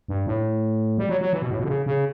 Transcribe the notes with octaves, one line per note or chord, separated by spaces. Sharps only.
G2
A2
G3
F#3
F#3
E3
B2
A2
B2
D3
C#3
C#3